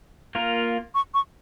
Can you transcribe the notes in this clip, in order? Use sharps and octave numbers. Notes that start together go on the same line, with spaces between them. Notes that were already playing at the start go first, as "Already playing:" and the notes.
A#3 F4 A#4
C#6
C#6